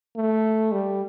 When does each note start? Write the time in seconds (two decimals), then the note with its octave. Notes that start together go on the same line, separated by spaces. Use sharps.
0.16 A3
0.72 G3